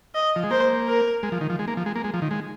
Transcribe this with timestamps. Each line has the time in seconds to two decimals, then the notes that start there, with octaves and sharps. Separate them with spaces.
0.15 D#5
0.36 F3
0.44 G#3
0.51 A#3 C5
0.88 A#4
1.23 G#3
1.32 F3
1.41 D#3
1.50 F3
1.59 G#3
1.68 A#3
1.77 F3
1.86 G#3
1.96 A#3
2.04 G#3
2.14 F3
2.22 D#3
2.31 G#3